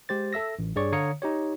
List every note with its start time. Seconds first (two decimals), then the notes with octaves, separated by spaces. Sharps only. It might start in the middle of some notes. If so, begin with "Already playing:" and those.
0.09 G#3 G4 C5 A6
0.33 A4 E5 E6 A#6
0.59 A1
0.76 G2 G#4 C#5 D5 C#6
0.92 D3 C#5 F5 A#5 D#6 C#7
1.22 D#4 G4 C#5